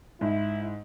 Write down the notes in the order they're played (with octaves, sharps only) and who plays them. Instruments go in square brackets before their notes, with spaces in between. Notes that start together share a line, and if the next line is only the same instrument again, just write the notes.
[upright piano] G#2 [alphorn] E4